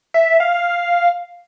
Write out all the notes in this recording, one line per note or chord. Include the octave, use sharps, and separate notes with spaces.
E5
F5